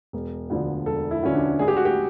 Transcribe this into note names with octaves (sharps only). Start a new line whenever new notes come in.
E1
D2 D3 F3
E1 A4
E4
D2 D3 F3 C#4
D4
G#1 G#4
G4
F#4
G4